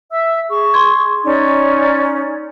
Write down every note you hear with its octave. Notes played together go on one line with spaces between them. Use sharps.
E5 E6
G#4 C#6
C6 G#6
C#4 D#4 D5